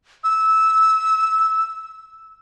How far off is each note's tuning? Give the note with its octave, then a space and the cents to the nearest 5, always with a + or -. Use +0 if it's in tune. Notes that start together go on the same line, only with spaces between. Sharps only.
E6 -15